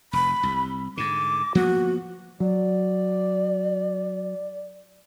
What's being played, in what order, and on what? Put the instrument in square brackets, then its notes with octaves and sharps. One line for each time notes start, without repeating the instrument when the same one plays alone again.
[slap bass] F1 [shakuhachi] B5
[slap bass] C2
[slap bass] G#2 D3 [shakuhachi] D6
[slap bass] F3 A#3 B3 [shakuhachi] F#4
[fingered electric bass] F#3 [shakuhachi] D5